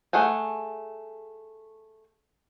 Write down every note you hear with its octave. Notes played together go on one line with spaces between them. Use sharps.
A3 G#4 F#5 G#5